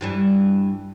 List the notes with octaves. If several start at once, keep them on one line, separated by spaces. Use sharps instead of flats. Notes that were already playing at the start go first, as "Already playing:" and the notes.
G2 E3 G3